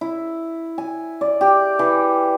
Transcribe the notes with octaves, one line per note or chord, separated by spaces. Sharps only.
E4
G#5
D5
G4
E3